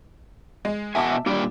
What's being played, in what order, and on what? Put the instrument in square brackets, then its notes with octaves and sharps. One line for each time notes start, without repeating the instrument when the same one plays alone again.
[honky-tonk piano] G#3
[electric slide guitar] B2 F#4 G#5 [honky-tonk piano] E5 A5 D6
[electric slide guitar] A#2 G3 D5 [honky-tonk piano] D4